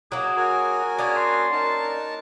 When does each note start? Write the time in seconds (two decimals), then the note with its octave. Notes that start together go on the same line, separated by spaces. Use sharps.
0.12 F#3 A#3 G#4
0.37 F#4 A#4 G#5
0.99 A#3 C#4 D4 G#4
1.16 C6
1.52 D#4 A#4 A5